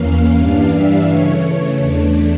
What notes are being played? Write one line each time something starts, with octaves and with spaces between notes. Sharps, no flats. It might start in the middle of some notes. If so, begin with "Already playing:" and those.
Already playing: E2 E3 A#3 C#4 F5
G2 E3 G3 D4 F5
E5
C#3 E3 A3 C#5
E2 E3 A3 D4